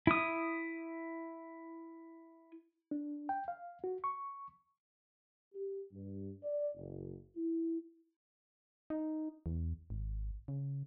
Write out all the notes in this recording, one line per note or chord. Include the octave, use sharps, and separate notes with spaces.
E4 D#6
D4
G5
F5
F#4
C#6
G4
G2
D5
F#1
E4
D#4
E2
G#1
C#3